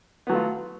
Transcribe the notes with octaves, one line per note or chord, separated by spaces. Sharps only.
F#3 A3 B3 F4